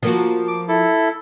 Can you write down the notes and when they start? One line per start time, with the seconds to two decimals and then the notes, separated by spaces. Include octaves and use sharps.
0.03 F3 A#3 F#4
0.48 D6
0.68 E4 A4